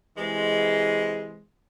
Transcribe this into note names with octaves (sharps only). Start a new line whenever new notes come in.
C3 E3 G#3